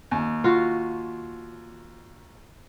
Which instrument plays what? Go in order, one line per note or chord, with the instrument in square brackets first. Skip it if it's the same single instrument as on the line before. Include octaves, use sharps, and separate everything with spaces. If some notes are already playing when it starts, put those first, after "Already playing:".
[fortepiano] D#2
[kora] F4 F#4